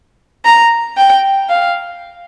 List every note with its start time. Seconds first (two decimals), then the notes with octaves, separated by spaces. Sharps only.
0.45 A#5
0.97 G5
1.50 F5